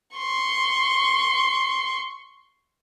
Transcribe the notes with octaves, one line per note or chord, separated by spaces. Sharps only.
C6 C#6